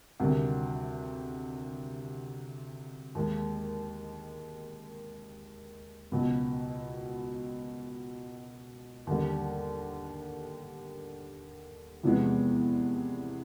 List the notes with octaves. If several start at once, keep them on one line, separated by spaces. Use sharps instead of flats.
D2 C3 D#3 G3
D#2 D#3 G#3
C#2 B2 F#3
D#2 D3 G3
E2 C3 F3 G#3 B3